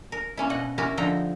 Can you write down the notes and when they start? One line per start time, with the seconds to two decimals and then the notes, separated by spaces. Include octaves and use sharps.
0.12 A#4
0.37 A#3 C#4 E4
0.50 B2 D#5 F#5
0.78 C#4 E4 F#4 G4 A#4
0.97 D3 F3 D#4 E5 G5 A#5